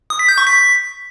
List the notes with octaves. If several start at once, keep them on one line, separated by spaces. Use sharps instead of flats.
D#6
B6
G6
C#6
B6